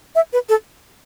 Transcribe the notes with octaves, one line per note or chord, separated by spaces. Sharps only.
E5
B4
A4